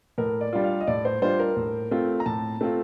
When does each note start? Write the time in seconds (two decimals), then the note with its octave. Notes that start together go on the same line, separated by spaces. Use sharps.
0.18 A2 A#4
0.41 D5
0.53 G3 D4 F4
0.64 F5
0.80 D#5
0.87 A2 D5
1.05 C5
1.22 G3 D4 F4 C5
1.39 A#4
1.56 A2
1.91 A3 C4 F4
2.20 A#5
2.26 A2 A5
2.61 A3 C4 F4